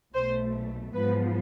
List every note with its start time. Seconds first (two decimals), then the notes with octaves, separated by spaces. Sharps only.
0.13 B1 B2 A3 C5
0.94 G#2 F3 B3 B4